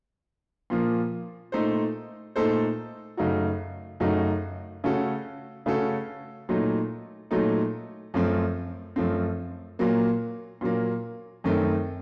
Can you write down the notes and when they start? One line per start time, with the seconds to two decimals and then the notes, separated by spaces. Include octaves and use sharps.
0.70 A#2 F3 A#3
1.52 A#2 A3 D#4 A4 C5
2.36 A#2 A3 D#4 A4 C5
3.17 F#2 C#3 A3 D#4 F#4
4.00 F#2 C#3 A3 D#4 F#4
4.84 C#3 A3 C#4 F#4 A4
5.66 C#3 A3 C#4 F#4 A4
6.49 A#2 F#3 A3 D#4
7.31 A#2 F#3 A3 D#4
8.14 F#2 F3 A3 C4
8.96 F#2 F3 A3 C4
9.79 A#2 F#3 A#3
10.61 A#2 F#3 A#3
11.44 F#2 D#3 A3 C4